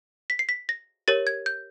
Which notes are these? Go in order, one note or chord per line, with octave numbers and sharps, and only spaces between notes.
B6
C7
B6
A#6
G4 A#4 C#5 A6
G#6
G6